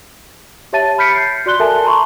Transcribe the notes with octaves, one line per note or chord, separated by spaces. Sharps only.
G4 C#5 E5 A5 A6 D#7
B5 F6 G6 B6 C#7 D7
G6 C7
F#4 D5 C6 F#6 G7
A4 A#4 E5 G#5 A5
A5 A#5 C6 C#6